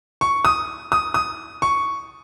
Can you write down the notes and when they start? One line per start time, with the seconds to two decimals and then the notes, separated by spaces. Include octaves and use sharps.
0.21 C#6
0.45 D#6
0.92 D#6
1.14 D#6
1.62 C#6